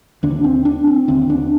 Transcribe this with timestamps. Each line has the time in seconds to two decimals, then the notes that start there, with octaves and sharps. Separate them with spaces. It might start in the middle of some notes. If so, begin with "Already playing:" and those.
0.23 D#2 D3 D4
0.44 C4
0.65 D4
0.87 C4
1.08 D#2 D3 C4
1.30 D4